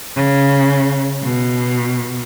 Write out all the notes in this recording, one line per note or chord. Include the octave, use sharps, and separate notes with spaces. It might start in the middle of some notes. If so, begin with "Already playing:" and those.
C#3
B2